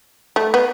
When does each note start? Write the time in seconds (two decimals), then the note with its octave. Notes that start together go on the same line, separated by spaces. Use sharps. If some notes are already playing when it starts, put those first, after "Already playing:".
0.36 A3
0.54 B3